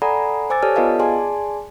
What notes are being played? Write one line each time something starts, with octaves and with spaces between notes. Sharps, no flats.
A4 D5 F#5 G#5 A#5 B5
C5 G#5 D6 E6 A6
G4 A4 C#5 D5 A5 F6
B3 F4 B4 D#5 F5 A5
G#4 D5 G#5 A5 C6